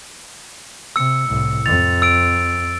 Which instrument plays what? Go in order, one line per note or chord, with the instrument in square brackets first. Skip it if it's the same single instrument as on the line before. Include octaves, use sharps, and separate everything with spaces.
[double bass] C3 [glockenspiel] E6 C#7
[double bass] C2 A2
[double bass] F2 [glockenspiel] A6 F7
[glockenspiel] E6 D7